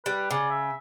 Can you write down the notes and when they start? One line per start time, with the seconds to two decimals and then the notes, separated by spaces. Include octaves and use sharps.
0.06 G3 B4
0.31 C#3 D5
0.50 E5